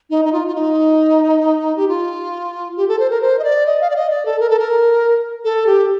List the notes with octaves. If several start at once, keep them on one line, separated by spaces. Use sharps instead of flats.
D#4
D#4
F4
F4
D#4
G4
F4
G4
A4
C5
A#4
C5
D#5
D5
D#5
F5
D5
D#5
D5
A4
A#4
A4
A#4
A4
G4